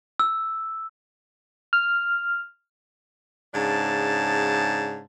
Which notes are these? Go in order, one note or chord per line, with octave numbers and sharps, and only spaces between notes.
E6
F6
G#2 C#3 D4 A5